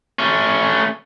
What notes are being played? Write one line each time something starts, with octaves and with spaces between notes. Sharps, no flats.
A3 C#4